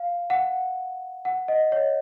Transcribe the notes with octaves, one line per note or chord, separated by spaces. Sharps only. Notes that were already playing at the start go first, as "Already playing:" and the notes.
Already playing: F5
F#5
F#5
D#5
C#5